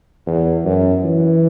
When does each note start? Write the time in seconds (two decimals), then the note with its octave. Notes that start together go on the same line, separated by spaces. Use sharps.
0.26 E2
0.65 F#2
1.04 E3